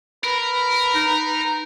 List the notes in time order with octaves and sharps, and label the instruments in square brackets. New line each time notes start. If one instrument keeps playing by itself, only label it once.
[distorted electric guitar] A#4 [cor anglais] B4
[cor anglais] B4
[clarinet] D#4